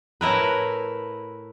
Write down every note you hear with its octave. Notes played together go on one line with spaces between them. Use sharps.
A2 E4 A#4 B4